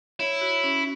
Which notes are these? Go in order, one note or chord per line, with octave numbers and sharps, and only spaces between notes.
E4 C#5
F#4
C#4